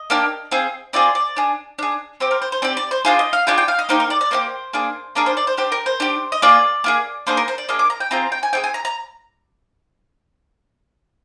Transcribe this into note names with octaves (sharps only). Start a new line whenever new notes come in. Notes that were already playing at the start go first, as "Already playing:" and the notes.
Already playing: D#5
A#3 D4 G4
C4 F4 G#4
C4 F4 G#4 D5
D5
D4 G#4
D4 G#4
C4 G4 C5
A#4
C5
C5
C4 G4 D5
D5
C5
D4 F4 G#4 C5
D#5
F5
D4 F4 G#4 G5
G5
F5
D#5
A#3 D#4 G4 C5
A#4
D5
D5
A#3 D#4 G4 C5
A#3 D4 G#4
A#3 D4 G#4 A#4
C5
D5
C5
D4 G4 C5
A#4
C5
D4 G4
D#5
A#3 F4 G#4 D5
A#3 F4 G#4
A#3 D4 G#4 C5
A#4
C5
D5
A#3 D4 G#4 D#5
D6
A#5
G5
C4 F4 G#4 A#5
G5
G#5
C4 F4 G#4 G5
G#5
A#5
A#5